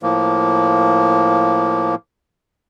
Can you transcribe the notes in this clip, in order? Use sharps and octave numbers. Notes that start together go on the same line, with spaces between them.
A2 F3 A#3